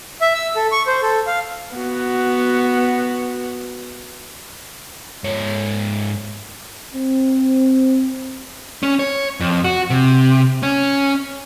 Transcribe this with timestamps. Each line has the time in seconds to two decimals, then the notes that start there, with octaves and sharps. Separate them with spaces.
0.21 E5
0.34 E6
0.56 A4
0.72 C#6
0.87 C5
1.02 A4
1.27 F5
1.74 B3 F#4
5.24 G#2 C#5
6.94 C4
8.83 C#4
8.99 C#5
9.40 F2
9.64 F#4
9.90 C3
10.63 C#4